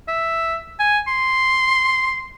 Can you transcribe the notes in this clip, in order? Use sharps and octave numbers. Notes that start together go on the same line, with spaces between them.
E5
G#5
C6